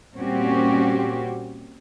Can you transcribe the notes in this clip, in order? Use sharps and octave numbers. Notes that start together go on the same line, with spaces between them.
A#2 G3 C4 C#4 F#4 G4